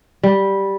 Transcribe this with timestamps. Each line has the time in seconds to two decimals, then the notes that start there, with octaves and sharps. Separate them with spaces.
0.23 G3